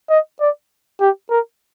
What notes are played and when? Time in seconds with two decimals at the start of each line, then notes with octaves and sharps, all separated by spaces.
0.10 D#5
0.41 D5
1.00 G4
1.30 A#4